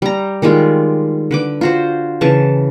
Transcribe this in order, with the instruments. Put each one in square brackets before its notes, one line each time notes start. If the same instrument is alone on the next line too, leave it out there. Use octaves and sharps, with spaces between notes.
[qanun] G3 A#5
D#3 G3 G#3 F4
D3 B4 D6
F4 F#4 C5
C#3 E3 A5 C#6